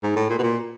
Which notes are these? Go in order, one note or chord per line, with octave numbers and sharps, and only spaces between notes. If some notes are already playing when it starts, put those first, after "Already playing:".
G#2
A2
A#2
B2
A#2